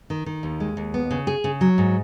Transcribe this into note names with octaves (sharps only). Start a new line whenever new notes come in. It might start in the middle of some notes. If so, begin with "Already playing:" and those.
D#3
D#3
D#2
G#3
D#2
B3
C#3
G#4
C#3
F#3
G#2